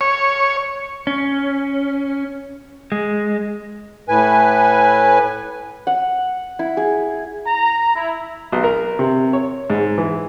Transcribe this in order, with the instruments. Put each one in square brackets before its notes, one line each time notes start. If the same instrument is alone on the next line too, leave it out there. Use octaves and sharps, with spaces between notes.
[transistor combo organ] C#5
[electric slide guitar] C#4
G#3
[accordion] A2 B4 G#5
[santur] F#5
E4
G#4
[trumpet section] A#5
E4
[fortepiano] B1
A#4
C3
C#5
G#2
E3